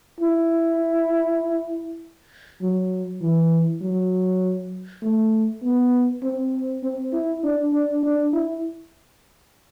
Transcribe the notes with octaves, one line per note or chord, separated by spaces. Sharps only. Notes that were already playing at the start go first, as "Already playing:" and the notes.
E4
F#3
E3
F#3
A3
B3
C4
C4
E4
D4
D4
D4
E4